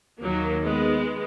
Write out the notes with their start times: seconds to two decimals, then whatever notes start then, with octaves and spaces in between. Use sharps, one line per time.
0.21 D#2 D#3 F#3 A#3
0.63 G#3 B3